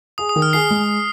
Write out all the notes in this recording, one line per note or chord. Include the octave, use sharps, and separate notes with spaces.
G#4 D#6
D#6
D#3
F6
G#4 C7
G#3